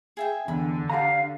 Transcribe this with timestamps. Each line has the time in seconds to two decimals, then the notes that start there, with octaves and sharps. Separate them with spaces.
0.17 G#4 E5 G5
0.48 E2 D3 B5
0.90 G4 F5 F#5 A#5